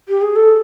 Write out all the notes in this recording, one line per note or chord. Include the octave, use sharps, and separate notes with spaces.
G4
G#4
A4